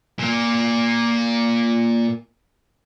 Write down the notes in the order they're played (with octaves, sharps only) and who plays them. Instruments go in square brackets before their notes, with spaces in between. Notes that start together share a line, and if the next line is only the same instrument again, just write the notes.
[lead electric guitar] A#2 A#3